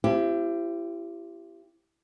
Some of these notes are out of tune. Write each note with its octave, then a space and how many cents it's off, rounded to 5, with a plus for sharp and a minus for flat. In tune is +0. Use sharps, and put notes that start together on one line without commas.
C4 +0 E4 +40 G4 +0